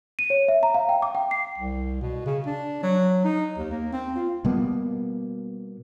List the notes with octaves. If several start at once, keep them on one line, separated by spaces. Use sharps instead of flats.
D#7
C#5
E5
A#5
F5
G5
D6
G5
C7
C2
B2
C#3
D4
F#3
D#4
D#2
A#3
C4
F4
B2 G3 A#3 B3